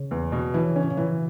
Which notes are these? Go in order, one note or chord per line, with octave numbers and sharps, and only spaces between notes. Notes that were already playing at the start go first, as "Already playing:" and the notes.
Already playing: C#3
E2
B2
C#3 E3
C#4
A2
A#2
B2 E3